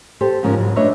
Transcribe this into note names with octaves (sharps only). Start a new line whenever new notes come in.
G4 A4 C5
G#2 C#3 F3 C#4 A#4 C#5
G#2 C#3 F#3
A3 D4 B4 C#5 D#5 E5